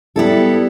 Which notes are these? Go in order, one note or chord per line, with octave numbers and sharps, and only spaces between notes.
G3 B3 E4 A4